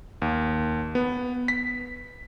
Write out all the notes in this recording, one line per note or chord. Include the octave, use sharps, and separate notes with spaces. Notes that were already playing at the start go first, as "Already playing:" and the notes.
D#2
B3
B6